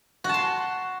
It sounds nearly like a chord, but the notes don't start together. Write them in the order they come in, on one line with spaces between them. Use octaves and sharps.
F#4 A5 C6